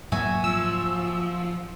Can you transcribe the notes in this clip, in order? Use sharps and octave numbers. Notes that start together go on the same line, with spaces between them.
G#2 F#3 A#3 F#4 E5 G#5
F3 E6